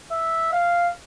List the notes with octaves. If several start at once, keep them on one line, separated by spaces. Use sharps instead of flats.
E5
F5